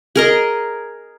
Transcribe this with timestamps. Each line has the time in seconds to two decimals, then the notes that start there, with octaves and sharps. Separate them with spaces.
0.16 G#4 A#4 D#5